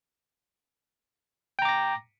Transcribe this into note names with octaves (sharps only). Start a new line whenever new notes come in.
G5 A#5 D6 A#6